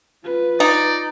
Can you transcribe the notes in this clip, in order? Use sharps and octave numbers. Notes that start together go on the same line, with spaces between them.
F4 B4
D#4 D5